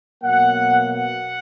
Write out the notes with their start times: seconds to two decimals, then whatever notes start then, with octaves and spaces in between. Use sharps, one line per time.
0.23 B2 F#3 A#3 F#5
0.87 F#5